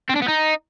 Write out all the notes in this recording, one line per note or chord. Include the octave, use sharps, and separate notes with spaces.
C4
D4
B3
D#4